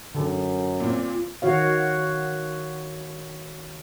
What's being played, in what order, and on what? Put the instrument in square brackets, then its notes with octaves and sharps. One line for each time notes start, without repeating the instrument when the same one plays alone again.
[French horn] F#2 [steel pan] D3 A4
[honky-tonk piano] A#2 C4 [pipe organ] F4
[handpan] D#3 F#4 C#5 F5